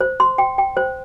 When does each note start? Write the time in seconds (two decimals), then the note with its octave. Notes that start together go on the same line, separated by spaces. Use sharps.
0.01 C5
0.20 C6
0.38 G5
0.58 G5
0.77 C5